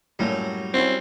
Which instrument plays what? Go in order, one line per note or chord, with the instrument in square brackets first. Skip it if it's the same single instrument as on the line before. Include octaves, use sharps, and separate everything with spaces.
[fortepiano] F#2 A2 A#3 [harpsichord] F#3 G3
[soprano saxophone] C4 [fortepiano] C#4 E4 F#4